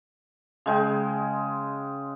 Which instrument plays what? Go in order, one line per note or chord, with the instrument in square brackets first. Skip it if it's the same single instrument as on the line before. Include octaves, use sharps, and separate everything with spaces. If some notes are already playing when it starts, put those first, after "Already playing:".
[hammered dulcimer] C#3 G#3 G5